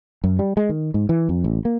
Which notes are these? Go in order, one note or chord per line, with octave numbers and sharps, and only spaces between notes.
F#2
G3
G#3
D#3
G#2
E3
F2
A1
A#3